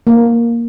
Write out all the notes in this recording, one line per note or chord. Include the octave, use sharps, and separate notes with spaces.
A#3